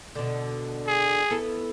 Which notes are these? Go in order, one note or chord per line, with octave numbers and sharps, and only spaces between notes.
B2 D3
G#4
B3 E4 A4